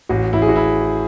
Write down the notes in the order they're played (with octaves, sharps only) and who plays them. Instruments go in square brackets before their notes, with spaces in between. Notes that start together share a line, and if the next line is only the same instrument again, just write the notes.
[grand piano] A1 F#4
A1 E4
G#4
F#4
E4